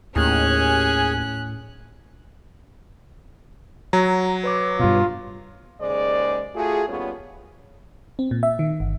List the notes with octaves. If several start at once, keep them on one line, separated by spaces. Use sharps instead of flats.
D#2 A2 C#4 G#4 G#5 F#6
F#3 A#5
B4 C#5 D6
G2 B2 F4
D#2 C#3 G#3 C5 D5
A3 F4 F#4 G#4
D#2 G3 B3 C#4 F4 C#5
C4
A#2
E5
D#3
G1